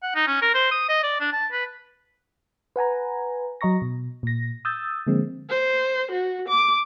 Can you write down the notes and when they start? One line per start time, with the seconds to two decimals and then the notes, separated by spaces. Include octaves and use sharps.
0.03 F#5
0.15 D#4
0.28 C#4
0.42 A#4
0.55 C5
0.71 D#6
0.89 D#5
1.03 D5
1.21 D4
1.32 A5
1.52 B4
2.76 B4 F#5 G#5 A#5
3.61 F#3 D#5 A#5 C#6 A#6
3.82 B2
4.23 A#2 A#6
4.65 D#6 E6 G6 A6
5.07 D3 F3 G#3 A#3 C4
5.50 C5
6.12 F#4
6.49 D6